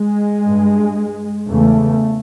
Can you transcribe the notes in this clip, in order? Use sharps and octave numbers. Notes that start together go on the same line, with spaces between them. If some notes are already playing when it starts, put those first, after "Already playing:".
Already playing: G#3
G2
E2 C#3 A3